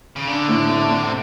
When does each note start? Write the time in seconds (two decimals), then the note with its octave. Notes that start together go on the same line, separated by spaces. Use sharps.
0.16 C#3
0.27 D3 D4
0.48 A2
0.69 A3
0.91 A3
1.03 C3